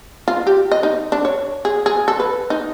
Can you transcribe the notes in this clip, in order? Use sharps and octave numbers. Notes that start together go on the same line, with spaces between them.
F4
G4
D#5
D#4
D4
C#5
G#4
G#4
A4
B4
D#4